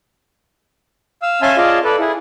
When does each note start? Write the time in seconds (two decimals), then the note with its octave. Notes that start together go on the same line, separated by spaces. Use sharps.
1.22 F5 E6
1.42 C#4 E5 F5 G#5 A5 C6
1.57 F4 G#4 D5 D#5 F5 A5
1.84 A4 B4 D5
1.99 E4 G#4